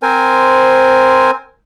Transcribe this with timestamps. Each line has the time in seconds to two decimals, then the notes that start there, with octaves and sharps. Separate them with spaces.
0.03 C4 A#4 C5 G#5